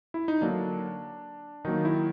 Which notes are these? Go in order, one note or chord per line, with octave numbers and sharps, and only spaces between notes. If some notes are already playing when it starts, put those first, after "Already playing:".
E4
D#4
D3 F#3 A#3 D4
D#3 F#3 A#3 D#4
E4